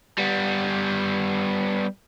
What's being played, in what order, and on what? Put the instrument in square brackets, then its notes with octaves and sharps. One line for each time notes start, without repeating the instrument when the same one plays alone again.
[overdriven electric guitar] G3 B3